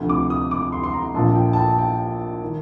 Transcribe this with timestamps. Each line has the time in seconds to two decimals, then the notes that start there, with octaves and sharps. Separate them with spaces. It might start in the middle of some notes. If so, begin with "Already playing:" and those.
Already playing: D2 C3 F3
0.09 D6
0.30 D#6
0.51 D6
0.72 C6
0.84 C6
0.94 A#5
1.14 A#1 A#2 F3 A5
1.35 G5
1.53 A5
1.57 G5
1.78 G5
2.42 D#3